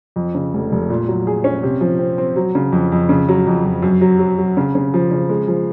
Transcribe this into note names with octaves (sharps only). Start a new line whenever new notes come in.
F2
C#3
F1
F1
A#2
F#3
G#4
C#4
C3
F3
C4
C4
F#3
C#3
F2
F2
C#3
F#3
F2
F2
F#2
F#3
F#3
F#3
C#3
C#3
F3
C#3
G#3
F3